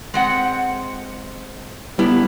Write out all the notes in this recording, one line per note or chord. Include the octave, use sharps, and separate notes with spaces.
G#3 C4 F#5
G3 B3 E4